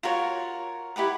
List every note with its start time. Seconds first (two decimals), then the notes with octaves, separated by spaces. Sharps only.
0.03 F4 F#4 A#4 C#5
0.96 E4 G4 B4 F#5